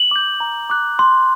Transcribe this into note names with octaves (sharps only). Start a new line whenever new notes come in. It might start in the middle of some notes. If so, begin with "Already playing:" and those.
Already playing: F#7
D6 G6
A#5
D6 F#6
C6